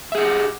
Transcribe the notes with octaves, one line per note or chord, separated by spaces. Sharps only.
G4 G#4 D#5 E5 F#5